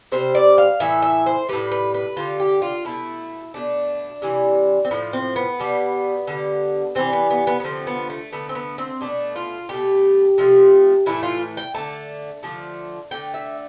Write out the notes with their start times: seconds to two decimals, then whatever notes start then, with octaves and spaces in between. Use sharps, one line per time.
0.12 C3 G3 C5
0.35 D5
0.58 F5
0.80 A2 E3 E5
1.02 E5
1.26 C5
1.49 A2 G3 B4
1.71 B4
1.94 B4
2.16 D3 G3 F4
2.40 G4
2.62 F4
2.85 B2 A3 E4
3.54 B2 A3 D4
4.22 C3 E3 G3
4.85 C4
4.91 A2 F3 A3 B3
5.13 C4
5.36 B3
5.60 B2 G3
6.27 D3 G3
6.95 C3 E3 G3 C4
7.13 B3
7.30 B3
7.47 B3
7.60 B3
7.64 D3 F3 A3 C4
7.87 B3
8.10 A3
8.32 D3 A3 B3
8.49 C4
8.55 B3
8.78 C4
9.01 B2 A3 D4
9.36 F4
9.69 B2 A3 G4
10.38 C3 F3 A3
11.06 A2 E3 A3 E4
11.23 F4
11.57 G5
11.74 D3 A3 A5
12.43 D3 F3 A3
13.11 D3 A3 G5
13.34 E5